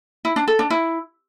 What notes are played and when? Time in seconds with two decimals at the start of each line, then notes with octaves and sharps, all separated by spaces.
0.25 E4
0.36 D4
0.48 A4
0.59 D4
0.70 E4